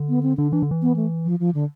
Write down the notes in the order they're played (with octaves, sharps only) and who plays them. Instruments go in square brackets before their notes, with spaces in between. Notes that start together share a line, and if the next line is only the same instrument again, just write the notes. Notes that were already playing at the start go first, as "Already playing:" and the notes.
Already playing: [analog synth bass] D3
[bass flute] B3
C4
[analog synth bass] D3 [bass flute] D4
[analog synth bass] E3 [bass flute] D4
[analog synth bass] D3
E3
[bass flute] B3
A3
F3
F3
D3